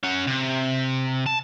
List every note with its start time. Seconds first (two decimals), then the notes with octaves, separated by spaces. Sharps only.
0.03 C#4 F#5
0.27 C3
1.26 A5